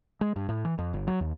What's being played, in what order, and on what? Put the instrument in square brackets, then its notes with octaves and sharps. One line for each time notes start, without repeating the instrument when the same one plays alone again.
[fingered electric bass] G#3
G2
A2
E3
F2
G1
F#3
D#2